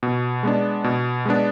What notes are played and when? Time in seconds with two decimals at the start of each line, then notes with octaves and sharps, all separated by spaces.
0.03 B2
0.43 G#3 B3 D4
0.84 B2
1.25 G#3 B3 D4